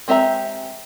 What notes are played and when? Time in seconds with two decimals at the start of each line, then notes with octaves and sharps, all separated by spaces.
0.08 G#3 C4 G4 E5 A#5